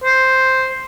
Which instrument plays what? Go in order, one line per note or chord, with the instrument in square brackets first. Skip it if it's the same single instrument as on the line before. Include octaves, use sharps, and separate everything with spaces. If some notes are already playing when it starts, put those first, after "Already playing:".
[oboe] C5